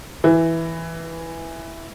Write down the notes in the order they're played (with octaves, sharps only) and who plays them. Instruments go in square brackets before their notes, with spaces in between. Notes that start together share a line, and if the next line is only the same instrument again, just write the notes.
[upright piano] E3